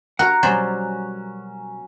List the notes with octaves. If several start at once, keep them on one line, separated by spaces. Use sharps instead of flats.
F#4 A#4 F#5 A#5 F#6
B2 F#3 G3 C#4 C5 D5